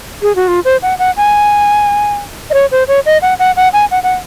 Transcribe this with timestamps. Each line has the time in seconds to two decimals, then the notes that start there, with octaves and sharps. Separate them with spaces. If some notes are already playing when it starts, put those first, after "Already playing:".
0.22 G#4
0.35 F#4
0.48 F4
0.65 C5
0.82 F#5
0.99 F#5
1.17 G#5
2.50 D#5
2.54 C#5
2.71 C5
2.88 C#5
3.06 D#5
3.22 F#5
3.39 F#5
3.56 F#5
3.73 G#5
3.91 F#5
4.03 F#5